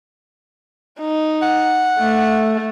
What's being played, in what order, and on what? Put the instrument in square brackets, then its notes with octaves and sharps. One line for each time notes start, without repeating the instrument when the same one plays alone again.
[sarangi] D#4
[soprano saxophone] F#5
[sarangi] A3